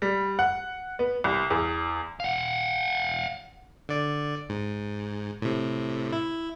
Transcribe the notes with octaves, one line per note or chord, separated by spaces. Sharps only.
G3
F#5
B3
C2
E2
F5 F#5
D3 D5
G#2
A2 C3
E4